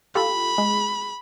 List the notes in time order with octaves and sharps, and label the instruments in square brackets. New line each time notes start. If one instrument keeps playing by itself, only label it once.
[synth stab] F4 G4 A4 [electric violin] B5
[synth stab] G#3